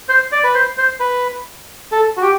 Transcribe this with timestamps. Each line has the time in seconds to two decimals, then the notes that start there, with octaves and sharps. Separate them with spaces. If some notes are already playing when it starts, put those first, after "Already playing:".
0.09 C5
0.32 D5
0.44 B4
0.54 C5
0.78 C5
1.00 B4
1.92 A4
2.17 F#4
2.22 G4